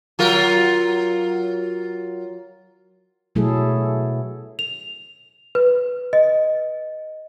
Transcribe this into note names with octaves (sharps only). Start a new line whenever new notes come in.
F#3 F4 A#4
B2 F#3 A3 E4 G#4 A4
F7
B4
D#5